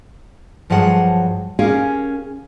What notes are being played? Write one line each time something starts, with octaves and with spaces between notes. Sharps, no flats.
G2 F3 F#3 G#4 F#5 A5
C#4 G4 G#4 A#4 F5